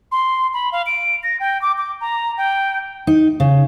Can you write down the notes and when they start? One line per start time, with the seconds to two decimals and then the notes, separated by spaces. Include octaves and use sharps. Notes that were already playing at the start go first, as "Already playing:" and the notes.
0.12 C6
0.54 B5
0.72 F5
0.86 D7
1.23 A#6
1.40 G5
1.62 D6
1.78 D6
2.01 A#5
2.37 G5
3.07 D#4
3.40 C#3